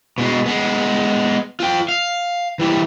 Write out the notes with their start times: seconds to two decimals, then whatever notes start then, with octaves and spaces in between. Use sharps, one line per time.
0.18 B2 G#3
0.46 G#3 B3
1.60 F4 G5
1.89 F5
2.60 E3 G3